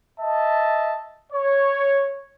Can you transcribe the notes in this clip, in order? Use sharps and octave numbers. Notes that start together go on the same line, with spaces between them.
D#5 E5 A5
C#5